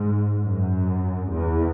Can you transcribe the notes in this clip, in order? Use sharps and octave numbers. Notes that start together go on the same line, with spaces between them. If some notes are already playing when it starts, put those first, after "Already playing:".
Already playing: G#2
F#2
E2